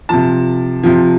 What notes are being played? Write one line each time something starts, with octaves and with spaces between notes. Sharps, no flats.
C3 F3 A5
C3 F3